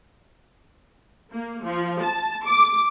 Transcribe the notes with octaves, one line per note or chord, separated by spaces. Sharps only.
A#3
F3
A5
D6